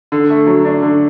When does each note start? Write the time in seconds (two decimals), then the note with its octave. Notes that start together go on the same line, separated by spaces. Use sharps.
0.12 D3
0.30 A3
0.47 F#3
0.65 D4
0.82 D3